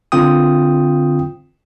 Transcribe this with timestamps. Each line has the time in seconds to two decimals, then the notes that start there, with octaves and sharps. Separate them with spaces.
0.12 D3 C4 F4 G5 D#6